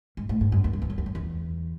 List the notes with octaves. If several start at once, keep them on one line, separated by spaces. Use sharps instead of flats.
G#2
A2
G#2
F#2
E2
F#2
E2
F#2
E2
F#2
E2